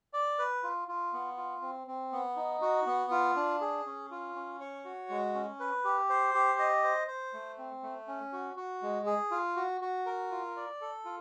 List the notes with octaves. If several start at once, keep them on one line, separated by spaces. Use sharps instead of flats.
D5
B4
F4
F4
B3
F4
C4
C4
B3
D#4
F#4
B3
F4
D4
G#4
C#4
F4
C#4
C#5
F#4
G#3
C#4
B4
G4
C5
G4
D#5
C5
C5
A3
C4
A3
C#4
F#4
F#4
G#3
G#4
F4
F#4
F#4
A#4
F4
D5
A4
F4